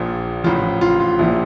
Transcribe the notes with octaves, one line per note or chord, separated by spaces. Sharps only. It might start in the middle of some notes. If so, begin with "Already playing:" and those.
Already playing: A#1 A#2 F3
A1 A2 F3 F4
F4
F4
A#1 A#2 F3 E4